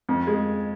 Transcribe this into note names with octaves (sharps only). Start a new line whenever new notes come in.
F2
G#3